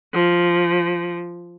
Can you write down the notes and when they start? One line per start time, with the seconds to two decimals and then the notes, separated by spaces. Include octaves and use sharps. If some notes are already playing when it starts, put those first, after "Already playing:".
0.13 F3